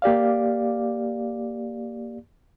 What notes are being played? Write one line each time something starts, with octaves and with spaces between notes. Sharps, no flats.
A#3 G4 D5 F5